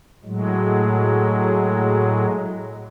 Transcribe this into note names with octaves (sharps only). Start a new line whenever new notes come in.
A2 F#3 G#3